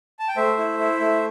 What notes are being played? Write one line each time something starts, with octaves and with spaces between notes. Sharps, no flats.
A5
G5
A3 C5 E5
E4
E4
A3